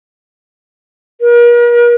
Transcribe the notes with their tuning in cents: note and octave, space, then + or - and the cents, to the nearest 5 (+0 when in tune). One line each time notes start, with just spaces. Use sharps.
A#4 +40